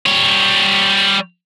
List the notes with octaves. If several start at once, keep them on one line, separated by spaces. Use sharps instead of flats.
G3 C#5